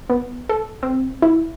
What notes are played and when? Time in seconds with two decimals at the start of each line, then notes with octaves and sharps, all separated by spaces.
0.10 B3
0.49 A4
0.83 C4
1.22 E4